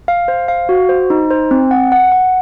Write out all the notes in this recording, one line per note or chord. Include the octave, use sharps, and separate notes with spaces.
F5
C5
F5
F#4
C5
D#4
C5
C4
F#5
F#5
F#5